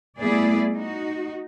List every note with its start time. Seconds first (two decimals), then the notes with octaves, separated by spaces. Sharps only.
0.19 G3 A3 B3 E4 G#4 D5
0.73 D#4 F#4